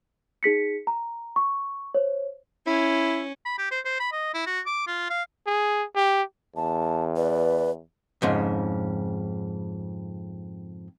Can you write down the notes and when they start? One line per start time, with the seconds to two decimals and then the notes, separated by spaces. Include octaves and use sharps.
0.43 D#4 G#4 B6 C#7
0.87 A#5
1.36 C#6
1.94 C5 C#5
2.67 C#4 E4
3.45 B5
3.58 G4
3.71 C5
3.85 C5
4.00 B5
4.12 D#5
4.34 E4
4.46 F#4
4.66 D6
4.87 F4
5.10 F5
5.47 G#4
5.96 G4
6.56 E2 A5
7.17 B4 D5
8.22 F2 G#2 C#3